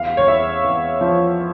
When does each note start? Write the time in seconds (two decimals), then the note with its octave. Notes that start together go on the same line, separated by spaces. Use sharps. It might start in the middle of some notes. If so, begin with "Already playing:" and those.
Already playing: E2 F5
0.17 C#5
0.27 E2 E5
0.64 E2
1.01 F3